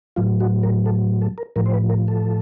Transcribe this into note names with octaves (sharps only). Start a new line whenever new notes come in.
A2 F#3 F4
F#4
A#4
A4
A4
A#4
A2 F3 A#4
C5
B4
A#4
A4